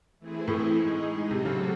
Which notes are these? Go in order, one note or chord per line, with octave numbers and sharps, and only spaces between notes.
E3 A3 C4 E4 G#4
A2
G#3 D#4 G#4
A2 C3 F#3 C4 F#4 A4
C#3